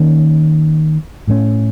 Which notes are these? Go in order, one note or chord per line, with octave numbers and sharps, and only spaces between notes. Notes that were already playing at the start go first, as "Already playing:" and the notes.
Already playing: D#3 A#3 C#4
A2 A3 C#4